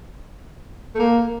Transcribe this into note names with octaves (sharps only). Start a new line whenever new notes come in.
A3
A#3